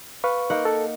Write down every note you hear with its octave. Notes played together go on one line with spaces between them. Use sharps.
B4 F5 C#6
A#3 D#4 F#5
A4